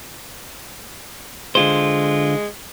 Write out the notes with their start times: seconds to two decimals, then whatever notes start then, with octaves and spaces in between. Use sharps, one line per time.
1.55 D3 G#3 F4 C5